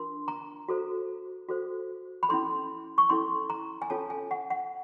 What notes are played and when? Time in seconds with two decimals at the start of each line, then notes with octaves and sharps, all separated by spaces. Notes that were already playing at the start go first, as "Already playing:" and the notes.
Already playing: D4 F4 A#4 C6
0.28 A#5
0.69 F#4 A4 C5
1.49 F#4 A4 C5
2.23 B5
2.29 C#4 E4 A4 C6
2.98 C#6
3.10 C#4 E4 A4 C6
3.50 A#5
3.82 G#5
3.90 C#4 F4 A4 C#5 A5
4.10 G#5
4.31 F#5
4.50 F#5